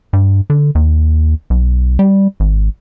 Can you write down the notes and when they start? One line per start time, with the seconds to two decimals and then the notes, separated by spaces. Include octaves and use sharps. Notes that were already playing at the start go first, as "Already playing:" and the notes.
0.13 G2
0.50 D3
0.75 D#2
1.50 B1
1.99 G3
2.40 G#1